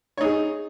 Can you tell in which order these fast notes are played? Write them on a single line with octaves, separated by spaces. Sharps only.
C#5 D#4 G#4